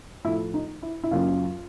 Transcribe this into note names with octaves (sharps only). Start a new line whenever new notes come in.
A2 F3 A3 E4
D#4
E4
E4
F#2 C#3 F#3 A#3 F4